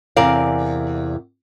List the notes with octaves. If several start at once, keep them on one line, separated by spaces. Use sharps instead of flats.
E2 C3 A#4 D5 F5